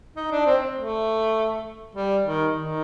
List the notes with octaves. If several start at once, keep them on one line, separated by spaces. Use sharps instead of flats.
D#4
D4
C4
A3
G3
D#3
D#3